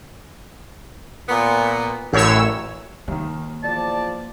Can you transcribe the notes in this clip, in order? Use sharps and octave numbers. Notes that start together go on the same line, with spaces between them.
A#2 B3
A1 F#2 C#5 E6
D#2 D#3 A#3
E2 F3 D5 A5